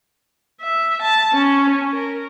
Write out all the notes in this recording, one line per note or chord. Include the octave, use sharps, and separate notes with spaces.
E5
A5
C#4
A#4